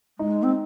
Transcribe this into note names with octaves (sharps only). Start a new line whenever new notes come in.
G#3 D#4
C4